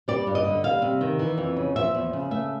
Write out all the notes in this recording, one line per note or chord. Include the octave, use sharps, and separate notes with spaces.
G3 D5
G2
D#5
D3
G3 F5
C3
D#3
E3
F2
C#3
F3 E5
E2
C#3
A3 E5